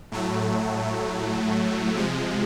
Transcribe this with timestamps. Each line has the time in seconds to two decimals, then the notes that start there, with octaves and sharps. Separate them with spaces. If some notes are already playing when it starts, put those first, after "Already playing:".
0.12 A2 F#3 A3
1.95 C3 F3 G#3